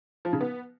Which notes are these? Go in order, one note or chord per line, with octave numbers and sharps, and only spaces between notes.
F3
C#3
B3